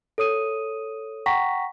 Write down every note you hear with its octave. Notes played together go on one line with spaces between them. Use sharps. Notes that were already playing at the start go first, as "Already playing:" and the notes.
A4 C#5 D#6 D#7
F#5 G5 A#5 C#6 A#6 B6